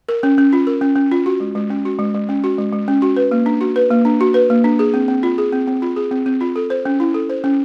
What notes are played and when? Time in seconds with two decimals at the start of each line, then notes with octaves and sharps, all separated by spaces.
0.09 A#4
0.23 C#4
0.38 C#4
0.53 F4
0.67 A#4
0.81 C#4
0.96 C#4
1.12 F4
1.26 F#4
1.40 G#3
1.55 G#3
1.70 C#4
1.85 F#4
1.99 G#3
2.14 G#3
2.29 C#4
2.44 F#4
2.58 G#3
2.73 G#3
2.88 C#4
3.02 F#4
3.17 B4
3.31 A#3
3.46 D4
3.61 F#4
3.76 B4
3.91 A#3
4.05 D4
4.21 F#4
4.34 B4
4.50 A#3
4.64 D4
4.79 G#4
4.94 C4
5.08 C4
5.23 F4
5.38 G#4
5.52 C4
5.67 C4
5.82 F4
5.96 G#4
6.11 C4
6.26 C4
6.41 F4
6.56 A4
6.70 C5
6.85 C#4
7.00 E4
7.14 A4
7.29 C5
7.44 C#4